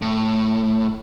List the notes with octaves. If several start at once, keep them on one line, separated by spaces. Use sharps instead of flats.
A2